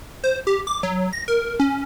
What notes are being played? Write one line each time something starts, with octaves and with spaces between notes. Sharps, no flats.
C5
G4
D6
F#3
A#6
A#4
C#4